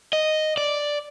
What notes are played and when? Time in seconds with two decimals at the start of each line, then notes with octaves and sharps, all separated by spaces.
0.13 D#5
0.57 D5